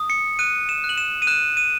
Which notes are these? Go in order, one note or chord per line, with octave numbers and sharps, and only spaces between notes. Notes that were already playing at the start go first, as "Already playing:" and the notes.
Already playing: D#6
C#7
F#6 D#7
E7
F#6
F#7
E7
D#7
F#6 E7
D#7